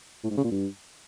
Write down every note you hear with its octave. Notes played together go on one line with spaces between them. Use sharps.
A2
G#2
C#3
A#2
G2